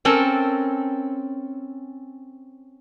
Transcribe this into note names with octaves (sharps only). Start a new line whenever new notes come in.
C4 C#4 A4 A#4 C5